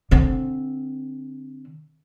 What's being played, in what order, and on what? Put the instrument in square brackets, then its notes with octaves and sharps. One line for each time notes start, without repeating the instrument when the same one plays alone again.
[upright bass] D3 C4